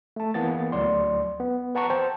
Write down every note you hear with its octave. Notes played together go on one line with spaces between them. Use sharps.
A3 A5
E3 A#3 B3 A6
D2 F#3 D5 C6
B3
B4 F#5 A5 A#5 C#6
C5 G5 A5